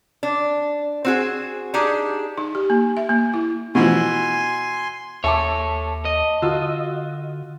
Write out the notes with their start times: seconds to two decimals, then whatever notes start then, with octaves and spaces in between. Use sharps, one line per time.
0.23 D4
1.05 C4 F#4 G#4
1.74 D4 D#4 G4 G#4
2.38 D#4
2.55 G4
2.70 A#3
2.97 E5
3.09 A#3
3.34 E4
3.75 B2 E3 F3 G#5 C6
5.24 D#2 A4 C#5 E5 A5 D6 E6
6.05 D#5
6.42 D3 F4 F#4 E6